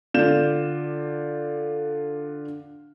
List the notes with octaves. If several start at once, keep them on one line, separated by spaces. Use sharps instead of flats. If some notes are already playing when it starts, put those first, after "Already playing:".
D3 F4 D5 G6 E7